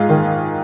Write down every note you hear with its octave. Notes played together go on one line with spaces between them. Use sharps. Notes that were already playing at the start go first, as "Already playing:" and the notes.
Already playing: G#2 F4 G#4
D#3